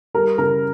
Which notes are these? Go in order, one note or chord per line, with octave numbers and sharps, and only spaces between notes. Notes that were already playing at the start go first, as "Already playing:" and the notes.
G3 A#4
C#3 A#4